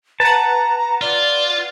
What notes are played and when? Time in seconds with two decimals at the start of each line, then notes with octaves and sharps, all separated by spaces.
0.20 B4 F#5 A5 A#5
1.01 F4 D5